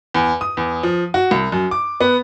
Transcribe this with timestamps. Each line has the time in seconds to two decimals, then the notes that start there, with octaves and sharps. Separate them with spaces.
0.14 E2
0.41 D#6
0.57 E2
0.83 F3
1.14 F#4
1.31 C2
1.52 F#2
1.71 D6
2.00 B3